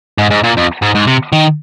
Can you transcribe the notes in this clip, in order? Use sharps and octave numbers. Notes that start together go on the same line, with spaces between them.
G#2
G#2
A#2
F2
G#2
G#2
C3
D#3